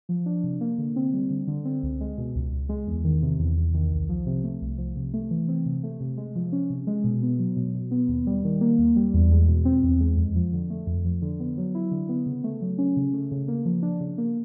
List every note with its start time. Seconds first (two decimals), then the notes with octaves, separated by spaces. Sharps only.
0.09 F3
0.26 D4
0.44 C3
0.61 A#3
0.78 D3
0.96 C4
1.13 G3
1.30 D3
1.48 D3
1.65 C4
1.83 C#2
2.01 G#3
2.18 B2
2.36 C#2
2.53 C#2
2.69 G#3
2.87 E2
3.04 D#3
3.22 C3
3.39 E2
3.57 E2
3.74 D#3
3.91 C2
4.09 F3
4.26 C3
4.44 A3
4.61 C2
4.78 F3
4.96 C3
5.14 A3
5.31 E3
5.48 C4
5.66 C3
5.83 A3
6.00 C3
6.17 G#3
6.35 F3
6.52 C#4
6.70 C3
6.87 G#3
7.04 B2
7.22 B3
7.39 F#3
7.56 B2
7.74 B2
7.91 B3
8.08 D#2
8.27 G3
8.44 D#3
8.61 A#3
8.78 D#2
8.96 G3
9.14 E2
9.31 G#3
9.48 B2
9.65 C4
9.83 E2
10.00 G#3
10.17 F2
10.35 F3
10.53 D3
10.70 A3
10.87 F2
11.05 F3
11.22 D3
11.40 B3
11.57 F#3
11.75 E4
11.91 D3
12.09 B3
12.26 C#3
12.44 A3
12.61 F#3
12.78 C#4
12.97 C#3
13.13 A3
13.31 C#3
13.48 A#3
13.65 F3
13.82 D4
14.00 C#3
14.18 A#3